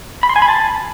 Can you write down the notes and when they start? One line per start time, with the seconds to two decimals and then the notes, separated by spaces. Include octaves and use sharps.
0.23 B5
0.29 C6
0.36 G#5
0.42 B5
0.48 A5